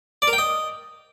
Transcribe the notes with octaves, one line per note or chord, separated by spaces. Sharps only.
D5
A#4
G5
D#5